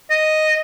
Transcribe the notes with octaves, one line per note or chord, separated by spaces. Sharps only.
D#5